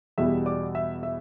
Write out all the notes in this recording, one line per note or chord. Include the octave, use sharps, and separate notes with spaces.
E2 B2 G3 E5 E6
D5 D6
E5 E6
E5 E6